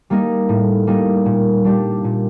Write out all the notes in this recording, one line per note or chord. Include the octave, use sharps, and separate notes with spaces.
G3 A#3 D#4 A#4
A2
G3 A#3 D#4 A#4
A#2
G3 D4 G4
A#2